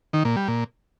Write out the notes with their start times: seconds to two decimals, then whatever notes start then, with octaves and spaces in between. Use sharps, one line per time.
0.13 D#3
0.25 A#2
0.36 G3
0.48 A#2